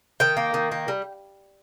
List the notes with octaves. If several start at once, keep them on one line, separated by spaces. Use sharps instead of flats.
D#3 G5
A#3
D#3
A#3
G3